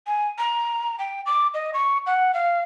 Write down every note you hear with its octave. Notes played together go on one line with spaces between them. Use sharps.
G#5
A#5
G5
D6
D#5
C#6
F#5
F5